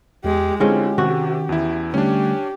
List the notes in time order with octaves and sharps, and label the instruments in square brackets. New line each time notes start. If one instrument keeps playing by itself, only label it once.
[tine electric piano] E2 [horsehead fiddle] G#3 G4
[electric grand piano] D3 C4 [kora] G#3 C#4 F4 [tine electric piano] E4 [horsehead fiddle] G4
[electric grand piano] C3 [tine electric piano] D#3 [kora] F#4
[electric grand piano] E2 E4
[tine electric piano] D3 G3 A3 [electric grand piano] C#4 D4 [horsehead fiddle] G4